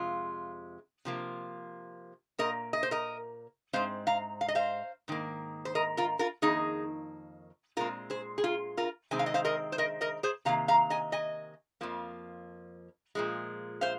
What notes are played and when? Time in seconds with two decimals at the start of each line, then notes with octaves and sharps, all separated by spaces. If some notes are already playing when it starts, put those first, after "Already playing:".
Already playing: F2 C3 G#3 F4
1.05 C3 F3 A#3
2.39 A#2 A#3 A#4 D#5
2.73 D#5
2.83 C5
2.91 A#4 D#5
3.73 G#2 G#3 C4 C5 F5
4.07 F5 A#5
4.41 F5
4.48 D#5
4.55 C5 F5
5.08 G#2 D#3 A#3
5.65 C5
5.75 A#4 D#5
5.97 F4 A#4
6.19 F4 A#4
6.42 F2 D#3 A#3 D#4 G#4
7.77 A#2 G#3 C4 F4 A#4
8.10 G#4 C5
8.38 G#4
8.44 F4
8.77 F4 A#4
9.11 C3 D#3 G#3 C4 G#5
9.19 F5
9.26 D#5
9.34 C5 F5
9.45 A#4 D#5
9.72 C5
9.78 A#4 D#5
10.01 A#4 D#5
10.23 G#4 C5
10.45 C3 D#3 A#3 F5 A#5
10.68 F5 A#5
10.90 D#5 G#5
11.12 D#5 G#5
11.81 F2 F3 A#3
13.15 A#2 F3 G#3
13.81 C5 F5